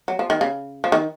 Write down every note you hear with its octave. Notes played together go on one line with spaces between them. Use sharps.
F#3
F3
D#3
C#3
F3
D#3